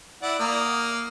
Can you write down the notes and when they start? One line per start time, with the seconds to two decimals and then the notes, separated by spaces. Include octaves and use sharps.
0.23 E4 D5 F#5
0.39 A#3 D#6